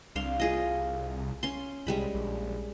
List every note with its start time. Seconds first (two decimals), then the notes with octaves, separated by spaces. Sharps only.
0.15 C2 D4 F5 C6
0.40 F4 G#4 D#5
1.43 C#4 C6
1.87 C2 G3 G#3 B5
2.15 A#1